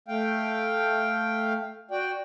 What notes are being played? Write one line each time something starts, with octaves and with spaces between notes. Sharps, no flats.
A3 F5 G5
F#4 D5 G5